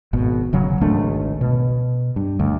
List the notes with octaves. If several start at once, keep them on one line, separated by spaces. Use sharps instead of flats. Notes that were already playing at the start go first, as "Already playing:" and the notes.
G#1 B2
E1 C#3 F#3
G#1 C#2 A3 D4
B2
G2
D2